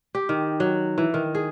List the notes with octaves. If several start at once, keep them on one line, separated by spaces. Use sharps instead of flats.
G4
D#3
F#3
E3
D#3
G#4